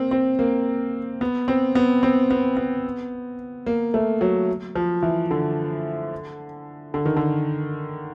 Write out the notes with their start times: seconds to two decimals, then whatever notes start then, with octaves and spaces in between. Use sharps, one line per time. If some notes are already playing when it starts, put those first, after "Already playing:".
Already playing: A#3 C4
0.11 C4
0.39 A#3
1.21 B3
1.48 C4
1.75 B3
2.03 C4
2.31 B3
2.57 B3
3.67 A#3
3.94 A3
4.21 F#3
4.75 F3
5.03 E3
5.31 D3
6.94 D3
7.05 D#3
7.17 D3